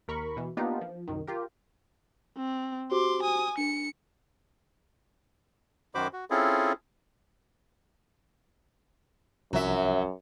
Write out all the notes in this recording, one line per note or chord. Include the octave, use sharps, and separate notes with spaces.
D#2 A#4 B5 C#6
B2 E3
A#3 B3 D4 D#4 F4 G4
F3
C2 F#2 D#3
F4 G4 A#4
C4
F#4 G4 C5 C6 D6
G#5 D#6
D4 C#7
F#2 D#3 F#4 C5 B5 D6
F#4
C4 C#4 E4 F4 G#4 A4
C2 F#2 F3 F#3 E5